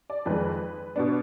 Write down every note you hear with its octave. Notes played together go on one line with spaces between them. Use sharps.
D5
F2 D#3 G#3 B4
B2 B3 D4